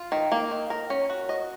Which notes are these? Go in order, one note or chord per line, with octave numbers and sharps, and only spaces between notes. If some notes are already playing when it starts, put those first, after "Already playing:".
Already playing: F4
D#3
A#3
D#3
A#4
C#4
F#4
D#5